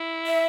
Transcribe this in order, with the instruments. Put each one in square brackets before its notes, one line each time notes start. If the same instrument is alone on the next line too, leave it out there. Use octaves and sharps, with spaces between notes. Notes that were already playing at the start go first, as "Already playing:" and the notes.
Already playing: [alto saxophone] E4
[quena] E5